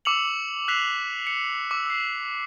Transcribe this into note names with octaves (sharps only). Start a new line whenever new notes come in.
D6 E6 C#7 F7 F#7
E6 F#6 B6 C7 F7
C#7
D6 E6
E6 C7